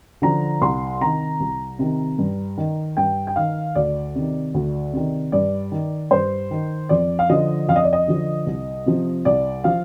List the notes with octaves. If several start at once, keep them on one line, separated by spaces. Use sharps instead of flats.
D3 F3 A#5
C2 C6
C3 D#3 A#5
C2
C3 D#3
G2
D#3
G2 G5
G5
D#3 F5
D2 D5
C3 D#3
D2
C3 D#3
G2 D5
D#3
G2 C5
D#3
F2 D5
F5
D3 F3 D#5
F2 F5
D#5
D5
D#5
D3 F3
C2
C3 F3
C2 D5
F3 F5